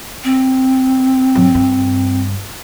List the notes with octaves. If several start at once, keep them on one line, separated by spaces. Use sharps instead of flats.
C4
G2 F#3
G2